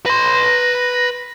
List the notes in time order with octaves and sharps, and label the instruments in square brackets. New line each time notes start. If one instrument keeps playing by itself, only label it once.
[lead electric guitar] B4 C6 [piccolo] A#6